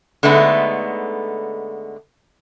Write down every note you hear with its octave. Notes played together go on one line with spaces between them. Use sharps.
D3 G#3 A3 B3 D#4